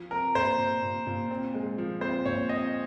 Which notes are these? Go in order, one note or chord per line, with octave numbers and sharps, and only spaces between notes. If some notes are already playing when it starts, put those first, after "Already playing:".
Already playing: F3
C4 A#4
A#2 C5
A#2
A#2
A#2
C4
G#3
F3
C4 C5
A#2 C#5
C4 D#5